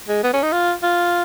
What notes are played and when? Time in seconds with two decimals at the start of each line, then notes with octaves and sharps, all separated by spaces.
0.09 G#3
0.24 B3
0.33 C#4
0.43 D#4
0.53 F4
0.83 F4